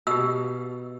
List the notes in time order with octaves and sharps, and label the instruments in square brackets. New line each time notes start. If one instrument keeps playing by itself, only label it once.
[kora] B2 [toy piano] G4 E6